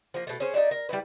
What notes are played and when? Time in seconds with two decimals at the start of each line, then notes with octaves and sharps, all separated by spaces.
0.14 F3 A#3
0.27 B2 A3
0.40 C#4 G#4 C5 C#5
0.54 D#4 F#4 D5 E5
0.71 A#4
0.89 G3 C#4 E4 B4